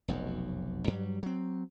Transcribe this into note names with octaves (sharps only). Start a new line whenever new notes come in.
F1 B1 F#2
G2 F#3 G3
F#3 C4